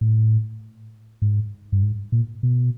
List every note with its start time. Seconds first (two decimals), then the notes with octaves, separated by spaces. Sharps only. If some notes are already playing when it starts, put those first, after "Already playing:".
0.01 A2
1.22 G#2
1.72 G2
1.83 G#2
2.12 A#2
2.43 B2